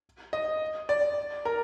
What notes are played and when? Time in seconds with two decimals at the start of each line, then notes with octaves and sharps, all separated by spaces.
0.33 D#5
0.89 D5
1.45 A#4